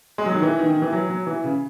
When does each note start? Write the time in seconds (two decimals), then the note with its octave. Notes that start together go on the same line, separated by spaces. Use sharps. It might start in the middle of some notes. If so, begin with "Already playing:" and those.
0.18 G#3
0.26 F#3
0.34 D#3
0.42 E3
0.59 D#3
0.70 D#3
0.82 E3
0.93 F#3
1.10 F#3
1.27 E3
1.44 C#3